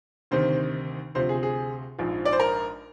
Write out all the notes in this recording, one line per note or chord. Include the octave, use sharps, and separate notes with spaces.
D2 C3 D#3 C5
D2 C3 F3 C5
G#4
G#4
A#1 G#2 F3
D5
C5
A#4